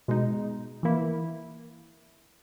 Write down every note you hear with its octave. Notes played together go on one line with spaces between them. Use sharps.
B2 G#3 D#4
E3 A#3 E4